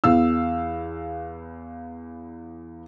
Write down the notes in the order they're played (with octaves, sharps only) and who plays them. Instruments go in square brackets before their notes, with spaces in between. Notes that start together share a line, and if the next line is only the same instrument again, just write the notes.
[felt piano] E2 B3 F5 E6